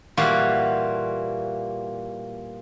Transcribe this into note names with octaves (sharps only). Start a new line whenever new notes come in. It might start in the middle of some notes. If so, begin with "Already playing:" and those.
A#2 E3 G3 A#3 F4 F#4